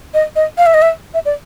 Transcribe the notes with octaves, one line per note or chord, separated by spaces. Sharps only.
D#5
D#5
F5
E5
D#5
E5
E5
D5